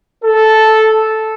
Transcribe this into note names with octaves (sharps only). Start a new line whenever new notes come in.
A4